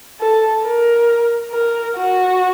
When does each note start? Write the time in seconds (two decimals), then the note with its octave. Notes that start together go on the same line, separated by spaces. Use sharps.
0.20 A4
0.65 A#4
1.52 A#4
1.96 F#4